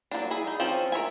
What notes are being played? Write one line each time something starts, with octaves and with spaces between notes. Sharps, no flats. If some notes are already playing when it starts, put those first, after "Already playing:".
F#3 G3 A#3 D4
E4 G#4
D#4
F3 C4 C#4 G#4
A#4 C#5 E5 G#5